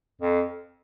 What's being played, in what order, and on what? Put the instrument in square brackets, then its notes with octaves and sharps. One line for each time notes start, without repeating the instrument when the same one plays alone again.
[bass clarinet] F2